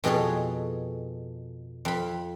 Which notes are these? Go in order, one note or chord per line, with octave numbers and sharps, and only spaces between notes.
F2 B2 G#4 A4 C#5
F2 B5